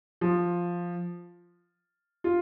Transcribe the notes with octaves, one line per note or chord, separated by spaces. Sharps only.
F3
F4